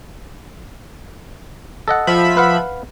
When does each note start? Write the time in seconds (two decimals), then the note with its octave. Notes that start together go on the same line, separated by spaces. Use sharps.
1.88 A4 D#5 F#5
2.07 F3 E5 B5
2.37 B4 F5 F#5